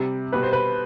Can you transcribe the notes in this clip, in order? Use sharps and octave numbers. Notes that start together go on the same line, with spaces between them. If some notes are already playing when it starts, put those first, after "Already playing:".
Already playing: C3 G3
B2 G3 B4
C5
B4